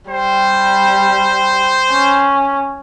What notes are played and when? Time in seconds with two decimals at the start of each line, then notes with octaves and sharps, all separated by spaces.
0.10 G3 C5
1.91 C#4